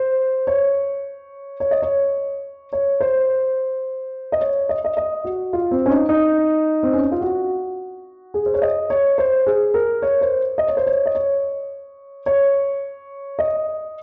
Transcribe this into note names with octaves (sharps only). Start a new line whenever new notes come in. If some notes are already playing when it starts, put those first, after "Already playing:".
Already playing: C5
C#5
C#5
D#5
C#5
C#5
C5
D#5
C#5
D#5
D#5
D#5
F#4
F4
C4
C#4
D#4
D#4
C4
C#4
D#4
F4
F#4
G#4
C5
C#5
D#5
C#5
C5
G#4
A#4
C#5
C5
D#5
C#5
C5
C#5
D#5
C#5
C#5
D#5